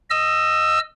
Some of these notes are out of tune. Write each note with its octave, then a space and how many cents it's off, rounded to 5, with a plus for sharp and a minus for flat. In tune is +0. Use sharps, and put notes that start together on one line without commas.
D#5 +0 E6 +20